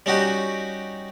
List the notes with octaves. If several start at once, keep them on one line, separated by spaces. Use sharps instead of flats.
G3 C#4 D#4 F#4 G4